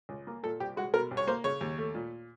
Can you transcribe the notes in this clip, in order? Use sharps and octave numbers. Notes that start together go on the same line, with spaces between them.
C#2
A#3
A#2 A4
C2 G4
G#3 F#4
B2 A#4
C2
C#5
A#3 C5
C#3 C#5
D#2
A3
A#2